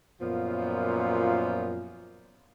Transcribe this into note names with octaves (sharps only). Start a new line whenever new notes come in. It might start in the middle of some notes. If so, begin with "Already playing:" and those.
F#2 A#2 F3 B3 F4 F5